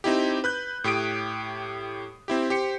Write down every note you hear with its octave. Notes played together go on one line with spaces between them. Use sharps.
C4 D#4 E4 G4
B4 F#6 G6
A2 G4 D#6 D7
C4 E4 G4
G4 C5 C#7